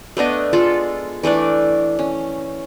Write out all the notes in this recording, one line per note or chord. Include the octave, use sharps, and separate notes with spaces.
A3 B3 D4 D#5
G#3 F4 A4
E3 A3 D4 D5
C#4